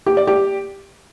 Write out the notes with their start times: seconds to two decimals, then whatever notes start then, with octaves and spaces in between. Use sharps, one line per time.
0.06 G4
0.17 D5
0.27 G4